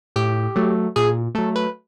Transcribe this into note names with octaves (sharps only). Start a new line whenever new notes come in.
A2 G4
F#3 A3
A#2 G#4
F#3 A3 A4
B4